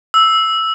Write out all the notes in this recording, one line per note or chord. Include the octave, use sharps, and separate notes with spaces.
E6